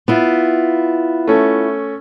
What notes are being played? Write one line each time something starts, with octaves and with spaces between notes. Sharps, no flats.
B3 E4 F4
A3 C#4